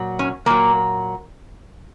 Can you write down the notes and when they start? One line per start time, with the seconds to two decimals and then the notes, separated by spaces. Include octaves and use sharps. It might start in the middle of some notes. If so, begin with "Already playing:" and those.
Already playing: A#2 F#3
0.19 C#4
0.46 A#2 F#3 A#3